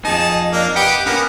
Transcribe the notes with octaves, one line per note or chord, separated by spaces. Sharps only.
F2 D#4 G#4 A5
A#3 D4
G4 B4 D#5 F#5 G5
A#3 B3 C#4 A#4